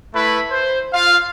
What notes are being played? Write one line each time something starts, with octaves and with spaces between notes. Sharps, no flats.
A3 E4 B4
C5
F4 F5